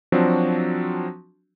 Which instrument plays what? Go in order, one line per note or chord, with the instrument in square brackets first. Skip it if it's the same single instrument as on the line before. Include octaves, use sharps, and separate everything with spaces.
[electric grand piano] F3 F#3 C4 D4 F#4